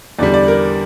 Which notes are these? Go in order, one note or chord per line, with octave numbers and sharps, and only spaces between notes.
E2 D3 G3 D5
D5
A#4